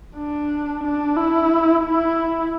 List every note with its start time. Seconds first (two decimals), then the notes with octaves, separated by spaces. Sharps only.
0.17 D4
0.83 D4
1.17 E4
1.84 E4